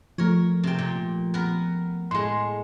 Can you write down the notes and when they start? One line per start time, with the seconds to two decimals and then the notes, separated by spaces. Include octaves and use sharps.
0.18 F3 A3 A#4 C#5
0.63 C3 G5
0.78 A#2
1.34 B3 A#4
2.11 A2 G#3 C6